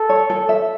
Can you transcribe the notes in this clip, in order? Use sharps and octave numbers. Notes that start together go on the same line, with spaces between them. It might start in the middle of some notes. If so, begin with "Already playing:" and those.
Already playing: A4
C#5
A4
E5